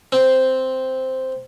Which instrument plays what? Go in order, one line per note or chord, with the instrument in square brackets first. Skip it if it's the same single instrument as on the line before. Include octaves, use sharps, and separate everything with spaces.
[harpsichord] C4